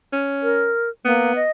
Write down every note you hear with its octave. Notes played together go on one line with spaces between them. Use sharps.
C#4
A#4
A#3 B3
D#5